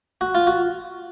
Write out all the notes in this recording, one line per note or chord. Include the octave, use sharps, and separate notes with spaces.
F#4
F4
F#4